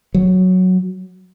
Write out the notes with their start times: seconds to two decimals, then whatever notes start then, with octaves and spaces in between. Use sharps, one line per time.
0.14 F#3